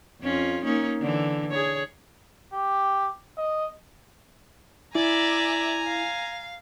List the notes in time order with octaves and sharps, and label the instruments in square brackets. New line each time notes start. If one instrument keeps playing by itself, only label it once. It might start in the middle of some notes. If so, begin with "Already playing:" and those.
[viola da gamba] F2 C#4 F4
A#3 C#4 D#4
D3 E3
G#4 C#5
[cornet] G4
D#5
[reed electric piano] E4 [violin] D5 E5 [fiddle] G#5 A#5
[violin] F5